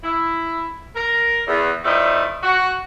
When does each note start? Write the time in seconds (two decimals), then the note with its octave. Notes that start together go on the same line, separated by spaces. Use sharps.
0.03 E4
0.95 A#4
1.47 E2
1.84 G2 F3 G3 A3 D#4 E4
2.43 F#4